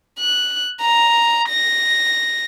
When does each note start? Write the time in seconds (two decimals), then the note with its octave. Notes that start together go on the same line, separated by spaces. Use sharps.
0.19 F#6
0.81 A#5
1.49 A#6